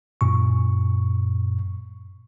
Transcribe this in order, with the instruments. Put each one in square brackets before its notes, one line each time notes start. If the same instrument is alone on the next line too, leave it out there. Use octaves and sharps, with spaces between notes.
[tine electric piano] F#2 A#2 C#6